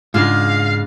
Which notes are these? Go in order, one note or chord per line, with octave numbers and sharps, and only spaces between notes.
G#2 C#3 G#3 D4 F4 G#4 F5